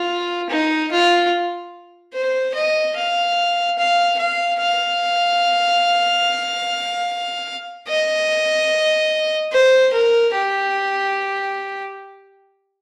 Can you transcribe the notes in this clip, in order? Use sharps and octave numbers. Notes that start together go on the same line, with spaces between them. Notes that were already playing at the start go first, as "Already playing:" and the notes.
Already playing: F4
D#4
F4
C5
D#5
F5
F5
F5
F5
D#5
C5
A#4
G4